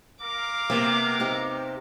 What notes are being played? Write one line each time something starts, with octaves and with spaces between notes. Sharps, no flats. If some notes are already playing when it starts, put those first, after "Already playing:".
A#4 F5 D6
C3 A#3 B3
C4 D#4 G4